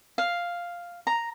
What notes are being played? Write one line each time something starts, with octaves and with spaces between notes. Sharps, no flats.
F5
A#5